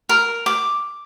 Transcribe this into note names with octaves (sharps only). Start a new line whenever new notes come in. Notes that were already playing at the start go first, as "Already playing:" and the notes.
A#4
D6